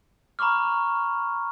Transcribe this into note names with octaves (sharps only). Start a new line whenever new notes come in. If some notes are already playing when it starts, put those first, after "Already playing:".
A#5 B5 C#6 D6 F6